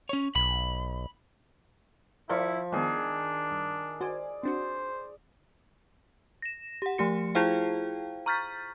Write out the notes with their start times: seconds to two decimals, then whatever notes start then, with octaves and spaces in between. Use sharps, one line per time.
0.09 C#4 C#5
0.36 B1 B5
2.29 F3 E4 A#4 D5 F5 C#6
2.72 D#3 G#3 B3 D4 G#4
3.51 G2
4.00 F#4 C5 D5 G#5
4.43 C4 D4 F#4 C5
6.42 A#6 E7
6.82 G4 F#5
6.98 F3 A3 G4 C#7
7.35 E4 F4 G#4 C5 F5 G5
8.26 A#5 C#6 F6 G6 A6 B6